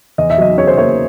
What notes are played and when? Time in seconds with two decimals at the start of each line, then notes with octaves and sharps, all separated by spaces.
0.18 E2 D#5
0.30 E5
0.38 F#3 D#5
0.58 C#3 C#5
0.68 C5
0.78 A#3 C#5